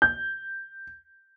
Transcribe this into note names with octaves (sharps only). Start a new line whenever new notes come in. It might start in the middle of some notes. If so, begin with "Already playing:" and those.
G6